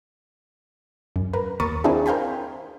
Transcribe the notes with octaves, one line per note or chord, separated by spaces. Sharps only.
F#2
A#4 B4
D#2 A#4 B5 C#6 D#6 A6
C4 D4 E4 G#4
A#4 C5 F5 G5 G#5 B5